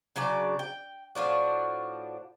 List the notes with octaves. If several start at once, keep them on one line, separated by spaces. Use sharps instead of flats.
C#3 F#3 D4 D5
G5
A2 F3 D4 F#4